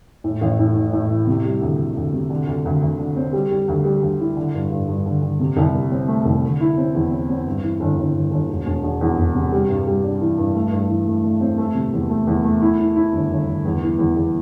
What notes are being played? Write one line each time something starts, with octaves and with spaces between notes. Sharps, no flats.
A2
A1
A2
A2
A2
E3
C3
G3
D2
D2
D2
C3
D3
D2
D2
D2
D3
C4
G3
G3
D2
G3
D2
E4
D3
G2
G2
G2
D3
D3
C3
C2
C3
C4
A3
C2
D3
E4
C4
E2
C4
C4
G2
E3
G1
G1
G1
G1
E1
E1
E1
E2
E1
C3
G3
G2
G3
D4
E3
G2
A3
G2
E3
A3
A3
C4
A3
C3
E2
A3
E2
A3
E4
E4
E4
G1
G1
G1
E2
E3
E2
E2